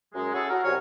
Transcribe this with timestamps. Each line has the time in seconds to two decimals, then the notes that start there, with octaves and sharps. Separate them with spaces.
0.14 F#2 G#3
0.34 C#4 E4 F#4 G#4 A4
0.50 F#4 A#4
0.64 C2 F#3 G3 C#5 G#5 F6